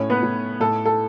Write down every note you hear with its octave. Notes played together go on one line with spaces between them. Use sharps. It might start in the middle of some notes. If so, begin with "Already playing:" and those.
Already playing: A2 C#4 C#5
B3 B4
A2
A2 A4
A4